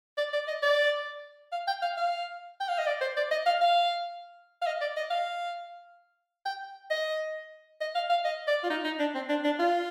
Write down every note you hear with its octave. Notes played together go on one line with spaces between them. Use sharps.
D5
D5
D#5
D5
F5
G5
F5
F5
G5
F5
D#5
D5
C5
D5
D#5
F5
F5
F5
D#5
D5
D#5
F5
G5
D#5
D#5
F5
F5
D#5
D5
F4
D#4
D#4
D4
C4
D4
D4
F4